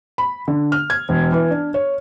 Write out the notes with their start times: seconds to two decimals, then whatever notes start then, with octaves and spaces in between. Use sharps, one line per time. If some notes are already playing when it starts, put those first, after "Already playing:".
0.18 B5
0.48 D3
0.72 F6
0.90 G#6
1.09 E1
1.32 E3
1.51 D4
1.74 C#5